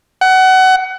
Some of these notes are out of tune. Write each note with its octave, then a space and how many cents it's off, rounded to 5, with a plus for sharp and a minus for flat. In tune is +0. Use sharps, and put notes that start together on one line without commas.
F#5 +25